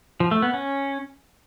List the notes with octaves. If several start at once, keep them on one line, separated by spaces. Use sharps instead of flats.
F3
A3
B3
C#4